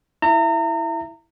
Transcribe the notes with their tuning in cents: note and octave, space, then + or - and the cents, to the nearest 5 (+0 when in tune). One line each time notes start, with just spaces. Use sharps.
E4 +0 E5 +20 A#5 -35